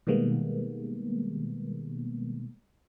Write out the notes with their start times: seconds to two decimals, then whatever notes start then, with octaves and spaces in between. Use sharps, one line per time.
0.07 B2 D#3 G3 G#3 A#3 B3